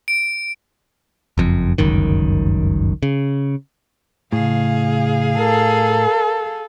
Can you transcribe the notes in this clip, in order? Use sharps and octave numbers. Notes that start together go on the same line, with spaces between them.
D7
F#1 F2
G1 C#2 F#2 D#3
C#3
A2 C#3 G#4 F5
A4 A#4